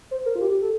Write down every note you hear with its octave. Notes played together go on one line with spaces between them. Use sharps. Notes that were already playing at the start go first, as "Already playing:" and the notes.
C5
A#4
F4
G4
G4
A4